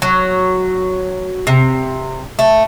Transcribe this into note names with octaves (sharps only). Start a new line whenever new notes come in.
F#3
C3
A3